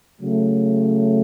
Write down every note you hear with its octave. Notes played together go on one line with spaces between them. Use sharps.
C#3 F#3 A3